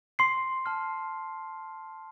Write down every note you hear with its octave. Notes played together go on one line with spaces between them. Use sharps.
C6 C7
A5 C6 F6